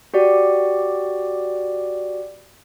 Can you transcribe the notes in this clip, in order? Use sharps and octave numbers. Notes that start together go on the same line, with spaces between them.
F#4 G4 D5